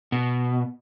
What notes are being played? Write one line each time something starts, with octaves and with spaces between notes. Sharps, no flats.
B2